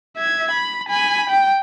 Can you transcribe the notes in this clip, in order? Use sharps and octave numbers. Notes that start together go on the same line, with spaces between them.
E5 G#6
B5
G#5 B5
G5